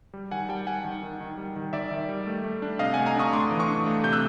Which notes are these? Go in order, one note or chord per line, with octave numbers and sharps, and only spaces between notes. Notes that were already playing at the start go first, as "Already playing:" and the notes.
G3
D#3 F#5 G#5
G3 G5 A5
G3 F#5 G#5
D#3
D#3
D#3
G3
D#3
D#3 D5 E5
D#3
G3
A3
A3
D4
C3 D#5 F5
F#5 G#5
A3
G#5 A#5
D4 C#6 D#6
A3 C6 D6
E3
C#6 D#6
D4
A3
C3 G6
E6 F#6